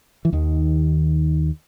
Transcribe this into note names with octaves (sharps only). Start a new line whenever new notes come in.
E3
D#2 D#3